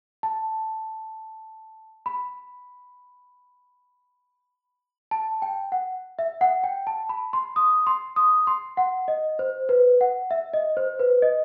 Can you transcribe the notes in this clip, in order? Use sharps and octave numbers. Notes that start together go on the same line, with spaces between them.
A5
B5
A5
G5
F#5
E5
F#5
G5
A5
B5
C6
D#6
C6
D#6
C6
F#5
D#5
C5
B4
F#5
E5
D#5
C5
B4
D#5